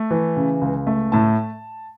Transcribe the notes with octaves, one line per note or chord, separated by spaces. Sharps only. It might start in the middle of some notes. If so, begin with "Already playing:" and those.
Already playing: A3
E3
C#3
C#2
A3
A2 A5